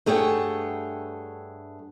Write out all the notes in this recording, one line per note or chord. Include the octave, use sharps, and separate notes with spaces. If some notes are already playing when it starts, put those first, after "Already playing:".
G2 A3 G#4 C#5 F#5 G5